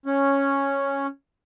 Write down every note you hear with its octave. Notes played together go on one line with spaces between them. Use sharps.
C#4